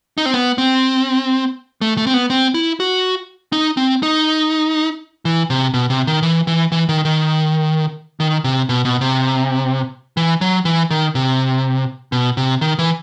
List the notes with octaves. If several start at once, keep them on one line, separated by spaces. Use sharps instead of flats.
D#4
C4
B3
C4
A3
A3
C4
B3
C4
E4
F#4
D#4
C4
D#4
E3
C3
B2
C3
D#3
E3
E3
E3
D#3
D#3
D#3
C3
B2
B2
C3
E3
F#3
E3
D#3
C3
B2
C3
D#3
E3